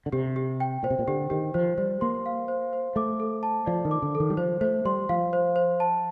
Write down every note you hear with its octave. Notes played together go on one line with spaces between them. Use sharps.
D3
C3 G4
G4
G5
A#2 C5
C3
A#2
D3 G4
D#3 G4
F3 C5
G3 C5
A#3 C6
F5
C5
C5
A3 D6
A4
A5
F3 D5
D#3
D6
D3
A4
D#3
G3
F3 C5
A3 C5
G3 C6
F3 F5
C5
C5
A5